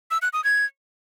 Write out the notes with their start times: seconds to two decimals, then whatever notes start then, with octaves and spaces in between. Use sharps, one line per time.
0.11 E6
0.22 F#6
0.33 D#6
0.44 G#6